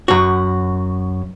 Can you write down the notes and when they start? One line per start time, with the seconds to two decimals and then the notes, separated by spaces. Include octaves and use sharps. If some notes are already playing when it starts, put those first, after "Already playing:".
0.08 F#2 F#4